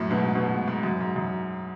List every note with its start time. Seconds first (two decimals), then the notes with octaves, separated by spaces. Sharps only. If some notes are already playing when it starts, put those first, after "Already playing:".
Already playing: F#2 A2
0.11 G#2 B2
0.35 G#2 B2
0.52 G#2
0.68 G#2
0.83 F#2
1.01 G#2
1.16 F#2